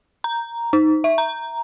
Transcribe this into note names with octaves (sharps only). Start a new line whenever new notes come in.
A#5
D#4
E5
A#5